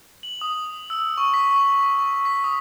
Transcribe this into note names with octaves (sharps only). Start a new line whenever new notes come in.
F#7
D#6
E6
C#6
B6
C#6
C#6
C#6
B6
D#6